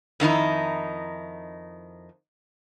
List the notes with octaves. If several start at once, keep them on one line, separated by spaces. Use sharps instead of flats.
F2 D#3 D#4 E4